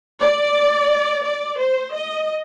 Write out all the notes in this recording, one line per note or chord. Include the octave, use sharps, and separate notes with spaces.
D5
D5
C5
D#5